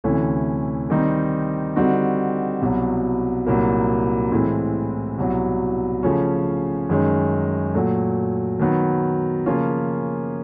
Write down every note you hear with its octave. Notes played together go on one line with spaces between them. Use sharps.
D2 C3 E3 A3 C#4
D#3 G3 C4 D#4
D3 G3 C4 D#4 F#4
C2 B2 F#3
C2 A#2 F#3 A#3
A2 E3 G#3 C4
C2 B2 F#3
C#3 F3 A3 C#4
F#2 D#3 G#3 C#4
A#2 F#3 A3
D#3 F#3 B3
C#3 F3 A#3 C#4 F4